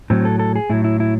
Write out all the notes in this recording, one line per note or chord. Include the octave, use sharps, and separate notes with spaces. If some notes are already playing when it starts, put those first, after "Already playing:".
A2 F#3 C4
A4
A4
G#4
A2 F#3 E4
E4
E4